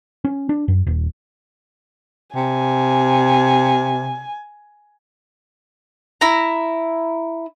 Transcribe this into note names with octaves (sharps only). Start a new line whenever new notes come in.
C#4
D4
F#2
D#1
C3 G#5
E4 A#5